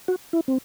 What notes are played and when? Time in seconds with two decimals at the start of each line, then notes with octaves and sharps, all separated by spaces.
0.08 F#4
0.33 E4
0.48 C4